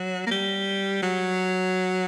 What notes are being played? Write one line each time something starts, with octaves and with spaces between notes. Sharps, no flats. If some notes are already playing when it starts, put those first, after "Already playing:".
Already playing: F#3
A#3
G3
F#3